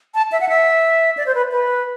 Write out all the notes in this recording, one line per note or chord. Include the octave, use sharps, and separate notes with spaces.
A5
E5
F#5
E5
D5
C5
B4
B4